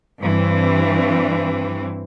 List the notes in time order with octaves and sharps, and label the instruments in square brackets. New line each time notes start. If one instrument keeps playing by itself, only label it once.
[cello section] G2 E3 C4